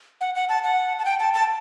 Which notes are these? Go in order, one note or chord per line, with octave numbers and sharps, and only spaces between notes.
F#5
F#5
A5
F#5
A5
G5
A5
A5